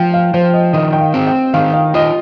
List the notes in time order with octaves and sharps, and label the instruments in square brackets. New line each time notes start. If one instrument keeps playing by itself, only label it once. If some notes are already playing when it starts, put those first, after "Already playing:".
Already playing: [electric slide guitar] F3 [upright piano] F5 G5
[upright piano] F5
[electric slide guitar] F3 [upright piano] C5
[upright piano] D#5
[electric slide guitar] D#3 [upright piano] D#5
[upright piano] G5
F5
[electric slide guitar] C4
[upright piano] G5
[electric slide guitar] D#3 [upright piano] F5
[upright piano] F5
[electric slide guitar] F4 [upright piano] D#5